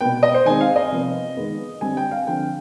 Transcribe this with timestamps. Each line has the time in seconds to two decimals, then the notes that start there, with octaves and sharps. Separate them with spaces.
0.01 B2 B3 G5
0.23 D#5
0.34 C5
0.46 D#3 G#3 C4 G#5
0.61 F5
0.76 D#5
0.91 C3 F3 B3
1.37 D#3 G#3 B3
1.81 D3 G3 C4 G#5
1.97 G5
2.11 F5
2.27 D3 F3 C4 G5